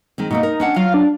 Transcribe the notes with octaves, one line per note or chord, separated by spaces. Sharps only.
D#3 G#3 C4
B2 A3 A#3 D#4
A#4
C#4 D4 F#5
F#3 F4 F5
D4